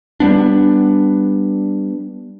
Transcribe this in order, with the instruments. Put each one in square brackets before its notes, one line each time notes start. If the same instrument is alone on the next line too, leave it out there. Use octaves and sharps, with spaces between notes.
[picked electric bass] G3 B3 D4